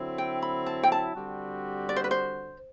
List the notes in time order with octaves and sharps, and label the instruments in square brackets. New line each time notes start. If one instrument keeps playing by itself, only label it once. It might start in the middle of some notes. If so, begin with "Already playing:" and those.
Already playing: [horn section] D3 F#3 C4 E4
[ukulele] G5
B5
A5
G5
A5
[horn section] D3 G3 C4 F#4
[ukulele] D5
C5
B4
C5